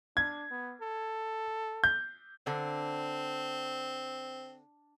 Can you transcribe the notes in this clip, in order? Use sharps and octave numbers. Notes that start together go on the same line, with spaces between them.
D4 G#6
B3
A4
G6
D3 C4 D4